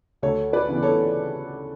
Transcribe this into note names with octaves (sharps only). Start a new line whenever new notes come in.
D2 A4 C#5
B4 D5
C#3 E3 B3
A4 C#5